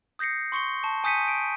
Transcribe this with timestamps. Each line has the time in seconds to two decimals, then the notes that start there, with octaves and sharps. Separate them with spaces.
0.19 D#6 G6 A#6 C7 C#7
0.52 C6 C#6 C#7 G7
0.83 A5 C#6
1.04 G#5 D#6 G6 B6 C#7 D#7
1.28 D7